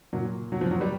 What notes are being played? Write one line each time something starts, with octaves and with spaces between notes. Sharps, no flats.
A#2 F#3
F#3
F3
F#3
G3